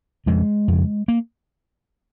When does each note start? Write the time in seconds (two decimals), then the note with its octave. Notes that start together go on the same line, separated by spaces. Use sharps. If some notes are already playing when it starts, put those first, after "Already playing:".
0.26 F2 C#3 G#3
0.68 F2 C#3
1.08 A#3